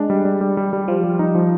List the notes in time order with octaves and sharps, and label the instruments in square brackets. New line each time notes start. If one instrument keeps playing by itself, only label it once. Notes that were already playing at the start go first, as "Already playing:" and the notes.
Already playing: [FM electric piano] G#3 [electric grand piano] D4
[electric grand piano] G3
G3
G3
G3
G3
[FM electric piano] F3 [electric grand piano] F4
[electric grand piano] G3
D#4
F3